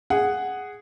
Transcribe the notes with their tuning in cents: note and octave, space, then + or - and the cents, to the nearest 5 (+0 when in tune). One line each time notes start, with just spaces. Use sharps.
G#4 -5 F#5 +5